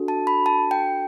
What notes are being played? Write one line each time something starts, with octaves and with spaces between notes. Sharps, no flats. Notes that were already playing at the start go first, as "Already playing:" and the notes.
Already playing: D4 F#4 A4
A5
B5
A5
G5